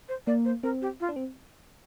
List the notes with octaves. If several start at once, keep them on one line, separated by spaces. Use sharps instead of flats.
C5
A#3 D5
C5
C4 A#4
G4
F4
D4
C4